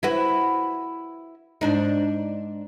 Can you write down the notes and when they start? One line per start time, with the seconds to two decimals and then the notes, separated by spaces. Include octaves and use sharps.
0.03 E4 F#4 B4
1.61 G#2 D4 D#4